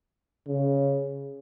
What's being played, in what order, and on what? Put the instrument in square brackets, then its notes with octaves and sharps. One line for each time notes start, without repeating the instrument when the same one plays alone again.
[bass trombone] C#3